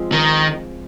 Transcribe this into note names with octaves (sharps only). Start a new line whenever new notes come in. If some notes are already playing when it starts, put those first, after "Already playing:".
Already playing: F3 G#3 C4
D#3